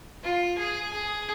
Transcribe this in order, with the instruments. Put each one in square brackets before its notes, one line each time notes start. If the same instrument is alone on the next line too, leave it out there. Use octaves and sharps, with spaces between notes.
[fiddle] F4
G#4
G#4